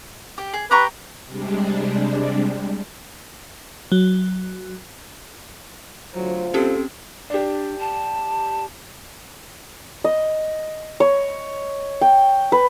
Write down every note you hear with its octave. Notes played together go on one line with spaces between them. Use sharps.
G4
G#4
G4 B4 A#5 C#6
C3 G3 G#3 D4
F#3
D2 F#3 F4 C5
C4 C#4 G4 A4
D4 G4 D5
A5
D#5
C#5
G5
B4